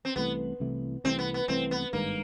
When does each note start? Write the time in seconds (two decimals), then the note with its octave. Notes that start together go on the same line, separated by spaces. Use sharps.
0.05 C4
0.16 C2 C3 E3 A3 B3
0.60 C2 C3 E3 A3
1.04 C2 C3 E3 A3 C4
1.19 B3
1.34 B3
1.48 C2 C3 E3 A3 C4
1.71 B3
1.93 G#1 G2 D#3 G#3 A#3